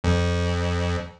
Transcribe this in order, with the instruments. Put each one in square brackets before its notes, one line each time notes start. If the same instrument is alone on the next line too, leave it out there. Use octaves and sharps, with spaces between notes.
[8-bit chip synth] F2